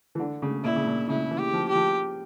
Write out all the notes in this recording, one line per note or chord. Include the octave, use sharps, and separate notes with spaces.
E3
D3
C#3
A#2 E4
C#3
A#2
C#3 E4
E3
G4
F3
G4
F3